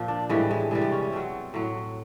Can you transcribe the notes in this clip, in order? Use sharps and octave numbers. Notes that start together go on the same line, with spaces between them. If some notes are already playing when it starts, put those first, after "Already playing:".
Already playing: A#2 F3
D4
A2 E3 G3 G#3
G#3
C3 E3 G3 G#3
G#3
C#4
C#4
B2 F#3 C4
A2 F#3